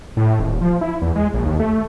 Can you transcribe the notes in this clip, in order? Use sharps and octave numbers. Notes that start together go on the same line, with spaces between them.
A2
D#1
F3
E4
E2
G#3
A#1
D#2
A3